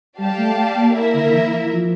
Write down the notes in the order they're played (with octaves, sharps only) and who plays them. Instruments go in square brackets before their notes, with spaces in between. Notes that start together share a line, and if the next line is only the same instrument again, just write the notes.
[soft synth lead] G3 [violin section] G4 D5 F5 A5
[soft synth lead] A3
A#3
[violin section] A#3 E4 A#4 E5
[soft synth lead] D3
E3
E3
F3